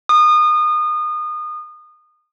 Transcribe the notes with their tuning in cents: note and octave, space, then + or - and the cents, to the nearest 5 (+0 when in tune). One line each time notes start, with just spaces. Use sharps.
D#6 -30